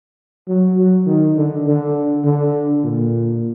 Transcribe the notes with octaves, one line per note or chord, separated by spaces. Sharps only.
F#3
F#3
D#3
D3
D3
D3
A#2